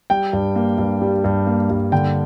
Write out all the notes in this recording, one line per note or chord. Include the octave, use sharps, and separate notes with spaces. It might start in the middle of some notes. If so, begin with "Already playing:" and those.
G3 G5
G2
A#3
G2
G3
G2
A#3
G2
D3 G5